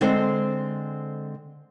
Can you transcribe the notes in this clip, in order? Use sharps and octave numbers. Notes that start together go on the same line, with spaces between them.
D3 G#3 C4 A4 C5